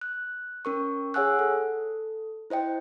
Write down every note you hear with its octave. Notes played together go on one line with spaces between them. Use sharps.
F#6
C#4 A#4 C#6
G#4 C#5 F#5 G#5 E6 F#6
A4
E4 C5 D#5 G5